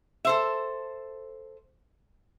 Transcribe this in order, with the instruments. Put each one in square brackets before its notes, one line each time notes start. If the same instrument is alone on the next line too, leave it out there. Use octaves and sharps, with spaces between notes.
[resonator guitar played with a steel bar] A4 C5 E5